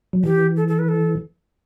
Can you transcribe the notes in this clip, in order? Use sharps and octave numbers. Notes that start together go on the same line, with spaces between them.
F#3
E3 G4
A4
A4
B4
A4